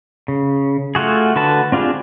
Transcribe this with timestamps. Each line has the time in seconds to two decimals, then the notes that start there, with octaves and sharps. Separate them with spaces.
0.28 C#3
0.95 A3 F4 F#4 G#4
1.36 D3 F#4 B4 A5
1.72 C4 D4 F4 G4 G#4